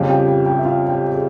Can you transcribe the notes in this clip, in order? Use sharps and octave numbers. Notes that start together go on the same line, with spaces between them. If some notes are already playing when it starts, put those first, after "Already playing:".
Already playing: F2 C#3 G3 F4 F5
G4 G5
G4 G5
G4 G5
E5
F4 F5
G4 G5
G5
G#4